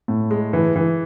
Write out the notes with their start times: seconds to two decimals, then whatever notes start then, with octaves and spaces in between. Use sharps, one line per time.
0.08 A2
0.31 G#3
0.53 E3
0.76 E3